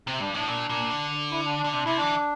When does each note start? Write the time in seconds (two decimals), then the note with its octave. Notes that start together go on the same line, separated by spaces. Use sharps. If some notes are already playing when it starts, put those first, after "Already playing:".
0.07 C3 C4
0.20 G2 D4
0.34 A2 D4
0.48 A#2 D4
0.69 A#2
0.90 D3
1.31 E4
1.45 D4
1.59 D4
1.64 D3
1.72 C3 D4
1.85 C3 E4
1.97 E3 D4